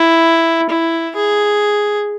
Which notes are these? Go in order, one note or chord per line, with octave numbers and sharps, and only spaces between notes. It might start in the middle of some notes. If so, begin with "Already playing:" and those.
Already playing: E4
E4
G#4